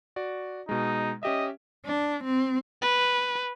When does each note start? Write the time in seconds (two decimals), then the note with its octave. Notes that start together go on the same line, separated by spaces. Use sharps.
0.16 F#4 D5
0.69 B2 G#3 D#4
1.23 C#4 G4 D#5 E5
1.85 D4
2.24 C4
2.82 B4